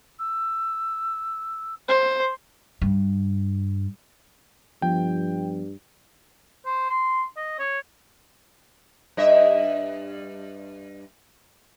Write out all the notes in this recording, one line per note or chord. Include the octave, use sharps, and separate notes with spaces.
E6
C5
G2
G2 F3 B3 G5
C5
C6
D#5
C#5
G2 D#5 E5